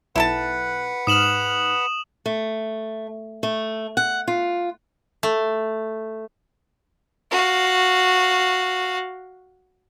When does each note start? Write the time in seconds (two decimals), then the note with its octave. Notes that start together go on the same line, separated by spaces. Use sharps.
0.16 B1 E4 A4 B4 F#5 A5
1.07 G#2 D#6 F6 E7 F#7
2.26 A3
3.43 A3
3.97 F#5
4.28 F4
5.23 A3
7.31 F#4 F5